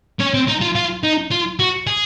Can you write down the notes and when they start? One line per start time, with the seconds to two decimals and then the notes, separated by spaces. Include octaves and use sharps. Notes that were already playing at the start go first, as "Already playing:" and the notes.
0.20 C#4
0.34 C4
0.48 D#4
0.62 F4
0.76 F4
1.04 D#4
1.32 F4
1.60 F#4
1.87 G#4